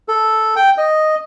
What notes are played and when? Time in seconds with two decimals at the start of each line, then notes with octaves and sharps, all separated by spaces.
0.08 A4
0.56 G5
0.78 D#5